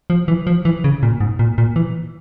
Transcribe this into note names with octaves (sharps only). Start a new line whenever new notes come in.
F3
E3
F3
E3
C#3
A#2
G#2
A#2
A#2
E3